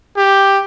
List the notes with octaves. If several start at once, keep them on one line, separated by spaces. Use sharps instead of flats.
G4